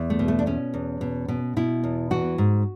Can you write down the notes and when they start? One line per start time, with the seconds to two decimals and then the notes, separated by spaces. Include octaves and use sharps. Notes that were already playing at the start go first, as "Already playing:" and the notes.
Already playing: E2
0.10 A3
0.19 B2
0.28 A3
0.39 D4
0.46 B2 C#4
0.74 E2
1.01 B2
1.28 B2
1.57 B2 E4
1.84 E2
2.11 E3 F#4
2.38 G#2